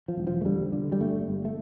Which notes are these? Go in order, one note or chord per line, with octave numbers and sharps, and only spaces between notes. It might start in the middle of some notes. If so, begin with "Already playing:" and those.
F3
E1
F3
A3
D3 G3
D3
G3
G1 A3
G1
A3